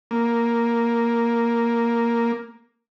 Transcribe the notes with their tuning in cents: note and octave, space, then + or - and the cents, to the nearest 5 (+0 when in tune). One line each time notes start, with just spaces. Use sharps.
A#3 +5